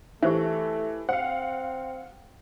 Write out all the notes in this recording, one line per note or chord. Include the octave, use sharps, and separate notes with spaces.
E3 A3 G4 C5 E5
C4 C5 F5 F#5